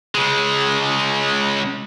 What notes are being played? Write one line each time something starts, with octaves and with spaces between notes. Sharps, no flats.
C#3 G#3